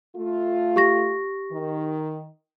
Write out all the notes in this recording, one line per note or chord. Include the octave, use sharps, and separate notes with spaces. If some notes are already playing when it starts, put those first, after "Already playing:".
A3 F4
G4 C#6 A#6
D#3